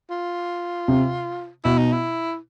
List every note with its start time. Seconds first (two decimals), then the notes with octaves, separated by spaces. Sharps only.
0.10 F4
0.88 C3
1.64 B2 E4
1.78 D#4
1.93 E4